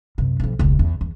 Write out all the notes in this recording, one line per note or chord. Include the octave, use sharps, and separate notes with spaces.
F#2 C3
B1 F3
E1 C#2
E2
E2